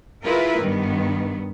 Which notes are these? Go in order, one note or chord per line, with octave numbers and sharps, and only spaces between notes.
E4 F4 G#4 A#4 B4
G2 D#3 B3